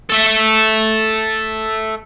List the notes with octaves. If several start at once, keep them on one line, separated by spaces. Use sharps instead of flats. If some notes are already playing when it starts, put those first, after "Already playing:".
A4 E5